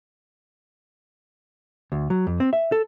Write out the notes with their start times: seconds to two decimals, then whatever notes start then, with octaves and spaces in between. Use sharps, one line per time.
1.92 D2
2.10 F#3
2.27 F2
2.40 C4
2.53 E5
2.72 A4